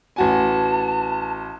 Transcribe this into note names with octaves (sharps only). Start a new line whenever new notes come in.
A1 F#4 G#5 A5